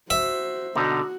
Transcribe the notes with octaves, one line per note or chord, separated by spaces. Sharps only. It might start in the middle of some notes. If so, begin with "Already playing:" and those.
F#4 C5 E5
B2 D3 D#4 F#4